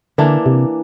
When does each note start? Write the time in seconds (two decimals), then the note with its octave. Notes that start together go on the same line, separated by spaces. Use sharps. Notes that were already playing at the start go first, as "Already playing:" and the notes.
0.18 D3 E3 A#3 D4
0.46 C3